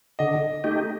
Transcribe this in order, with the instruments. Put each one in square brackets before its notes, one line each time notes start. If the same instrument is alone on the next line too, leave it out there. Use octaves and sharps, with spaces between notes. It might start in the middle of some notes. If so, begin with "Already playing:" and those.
[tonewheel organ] D3 [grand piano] D#5
[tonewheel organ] A3 D#4 G4